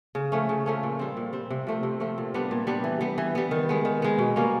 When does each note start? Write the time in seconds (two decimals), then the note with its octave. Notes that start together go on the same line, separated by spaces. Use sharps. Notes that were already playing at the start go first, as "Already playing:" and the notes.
0.15 C#3
0.32 F3 A3 C#4
0.49 C#3
0.66 F3 A3 C#4
0.83 A#2
0.99 G3 C4
1.17 A#2
1.33 G3 C4
1.51 C3
1.67 F3 A3 C4
1.83 C3
2.00 F3 A3 C4
2.18 A#2
2.34 G3 B3 D4
2.51 A#2
2.67 G3 B3 D4
2.84 E3
3.01 G3 B3
3.18 E3
3.35 G3 B3
3.51 D#3
3.69 G#3 B3
3.85 D#3
4.02 G#3 B3
4.18 B2
4.36 G3 A#3 C#4